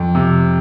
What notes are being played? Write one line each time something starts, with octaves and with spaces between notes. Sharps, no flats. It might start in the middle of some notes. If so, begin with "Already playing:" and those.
Already playing: F2
C3